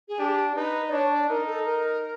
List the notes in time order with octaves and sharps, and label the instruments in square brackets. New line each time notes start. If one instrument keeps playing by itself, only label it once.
[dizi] G#4
[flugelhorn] D4 [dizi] G4
[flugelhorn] D#4 [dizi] B4
[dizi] D5
[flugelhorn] D4 [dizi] C#5
[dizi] D5
[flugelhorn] D#4 [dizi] A#4
[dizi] A4
A#4